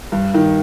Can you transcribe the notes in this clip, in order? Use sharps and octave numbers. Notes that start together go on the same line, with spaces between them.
G2
D#3